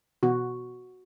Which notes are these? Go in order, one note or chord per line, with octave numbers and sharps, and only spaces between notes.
B2 E3 B3 F#4